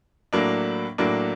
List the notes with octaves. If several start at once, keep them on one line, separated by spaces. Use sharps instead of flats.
A2 F#3 A#3 D4
A2 F#3 A#3 D4